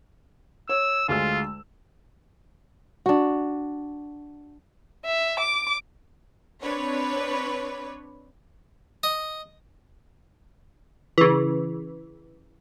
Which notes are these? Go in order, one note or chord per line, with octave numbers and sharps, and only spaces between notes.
C#5 E6
D2 G#3 F4 E6
D4 F#4
E5
D6
C4 D4 B4 C#5
D#5
C#3 E3